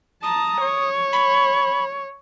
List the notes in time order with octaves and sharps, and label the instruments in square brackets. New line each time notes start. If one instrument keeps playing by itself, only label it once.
[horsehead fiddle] A5 A#5 [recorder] D#6
[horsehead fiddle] C#5
[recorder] B5